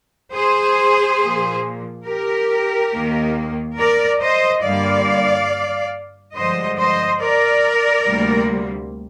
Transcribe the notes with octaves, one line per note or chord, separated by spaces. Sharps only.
G#4 C5
A#2 F3 A#3
G4 A#4
D#2 D#3 A#3
A#4 D5
C5 D#5
G2 D3 G3 A#3 D5 F5
G2 D3 F3 G#3 C5 D#5
C5 D#5
A#4 D5
D2 C3 G3 A#3